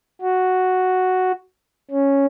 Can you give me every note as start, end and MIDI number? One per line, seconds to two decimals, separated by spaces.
0.22 1.32 66
1.91 2.26 61